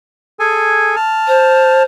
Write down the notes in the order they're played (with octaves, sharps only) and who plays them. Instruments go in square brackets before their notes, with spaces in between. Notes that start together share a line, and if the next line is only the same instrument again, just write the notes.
[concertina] G#4 A4 G#5
A5 F6
[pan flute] C5